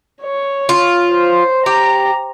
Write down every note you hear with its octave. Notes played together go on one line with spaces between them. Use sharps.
C#5
F4
C5
G4 A#5